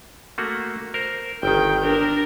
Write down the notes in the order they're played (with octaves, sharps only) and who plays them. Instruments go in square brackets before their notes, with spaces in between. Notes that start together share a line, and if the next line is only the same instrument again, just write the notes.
[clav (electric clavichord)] A3 A#3 F#4
A#4 C5
[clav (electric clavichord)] G1 D#3 [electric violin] G5
[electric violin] D4 A#4